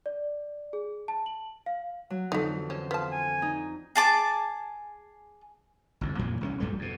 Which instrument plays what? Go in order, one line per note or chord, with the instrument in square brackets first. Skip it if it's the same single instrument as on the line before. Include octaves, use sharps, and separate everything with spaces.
[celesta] D5
G#4
A5
F#7
F5
[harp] F#3
[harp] F2 D3 E3 [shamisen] A3 D#4
[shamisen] C#4 [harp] C5
[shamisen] B3 A5 [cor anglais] F4
[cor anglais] G#5
[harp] D#4
[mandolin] G#4 A5 D6
[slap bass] G1 C2 F2
F2 A#2 E3 F3
C2 G3 C#4
A#1 G2 G3 A3
F2 B2